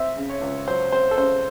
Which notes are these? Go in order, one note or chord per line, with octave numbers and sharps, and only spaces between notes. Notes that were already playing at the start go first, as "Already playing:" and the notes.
Already playing: C4 E5
C#3
C#5
C#2
F#3 C5
C4 C5
A4
C#3 C5